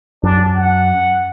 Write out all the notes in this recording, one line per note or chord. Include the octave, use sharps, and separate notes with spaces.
F#2 D4
F#5